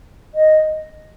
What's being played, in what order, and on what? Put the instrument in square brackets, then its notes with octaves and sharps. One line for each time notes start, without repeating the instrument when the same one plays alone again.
[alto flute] D#5